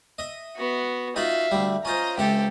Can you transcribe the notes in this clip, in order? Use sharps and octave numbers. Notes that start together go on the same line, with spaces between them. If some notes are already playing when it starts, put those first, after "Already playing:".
D#5 E5
B3 F#4
D#4 F4 F#4 E5 F5
D2 G3
C#4 F4 C5 D#5 A#5
C#2 C4 G4 A4 E5